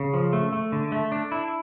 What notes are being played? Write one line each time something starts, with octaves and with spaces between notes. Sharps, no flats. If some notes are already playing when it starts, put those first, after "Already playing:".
Already playing: C#3
F3
A3
A3
D3
A3
D4
E4